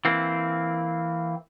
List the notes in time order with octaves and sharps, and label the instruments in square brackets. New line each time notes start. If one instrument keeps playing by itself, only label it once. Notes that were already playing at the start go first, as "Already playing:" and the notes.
[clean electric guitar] E3 A#3 C4